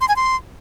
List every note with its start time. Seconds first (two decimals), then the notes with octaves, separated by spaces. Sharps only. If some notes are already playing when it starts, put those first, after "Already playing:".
0.01 C6
0.08 G#5
0.16 C6